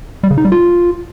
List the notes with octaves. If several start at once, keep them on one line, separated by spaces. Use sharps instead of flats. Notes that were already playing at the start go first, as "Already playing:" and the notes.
G3
C#3
D#4
G3
F4